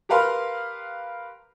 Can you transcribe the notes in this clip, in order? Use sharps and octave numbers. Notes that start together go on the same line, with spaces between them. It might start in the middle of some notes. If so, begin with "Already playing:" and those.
G4 A#4 B4 F5 C6